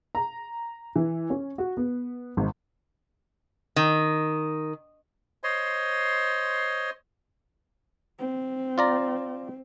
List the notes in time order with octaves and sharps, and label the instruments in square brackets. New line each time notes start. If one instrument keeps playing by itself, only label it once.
[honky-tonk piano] A#5
E3
C#4
F#4
B3
G#1
[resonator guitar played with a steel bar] D#3
[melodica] C5 C#5 D#5 C6
[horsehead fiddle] C4
[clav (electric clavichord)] F4 D5 A#5